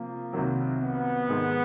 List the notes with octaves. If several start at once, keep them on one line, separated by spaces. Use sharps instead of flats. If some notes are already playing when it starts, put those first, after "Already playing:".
Already playing: C3 F3 A#3
C2 C3 D#3 F#3
B3
G#2 D#3 G#3